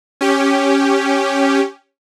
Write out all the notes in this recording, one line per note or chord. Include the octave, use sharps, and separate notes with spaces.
C#4 G4